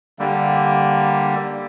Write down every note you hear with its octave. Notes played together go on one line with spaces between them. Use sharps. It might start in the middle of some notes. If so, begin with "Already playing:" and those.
D3 G3 A#3